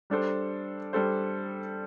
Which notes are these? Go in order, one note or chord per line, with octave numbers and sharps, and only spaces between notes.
G3 D4 A4 C5
G3 D4 A4 C5